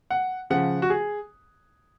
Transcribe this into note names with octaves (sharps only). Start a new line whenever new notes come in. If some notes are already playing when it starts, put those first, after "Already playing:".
F#5
C#3 F3 F#5
F#4
G#4